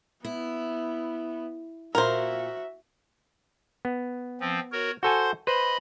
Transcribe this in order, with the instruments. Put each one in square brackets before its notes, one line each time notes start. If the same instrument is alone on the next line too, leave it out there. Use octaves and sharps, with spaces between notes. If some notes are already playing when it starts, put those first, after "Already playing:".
[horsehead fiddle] B3 [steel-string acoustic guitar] E4
[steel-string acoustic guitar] A#2 [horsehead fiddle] F#4 E5 [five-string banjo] A#4 C5
[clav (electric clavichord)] B3
[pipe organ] F3 C4
F#4 A#4 C#5
[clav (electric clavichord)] F#4 A4 G#5 [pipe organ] C5 C6
[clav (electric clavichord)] B4 C5 [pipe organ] D#5 B5